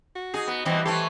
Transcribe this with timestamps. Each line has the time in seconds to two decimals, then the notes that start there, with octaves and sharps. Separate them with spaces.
0.16 F#4
0.34 D#4 G#4
0.47 B3
0.65 B2 E3 G3 C4 D#5
0.85 E3 A3 G4 A4 C#5 C6